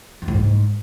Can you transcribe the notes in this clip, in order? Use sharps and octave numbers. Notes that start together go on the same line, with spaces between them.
F2
A2
G#2